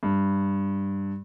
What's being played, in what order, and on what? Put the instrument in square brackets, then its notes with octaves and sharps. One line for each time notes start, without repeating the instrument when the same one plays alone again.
[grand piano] G2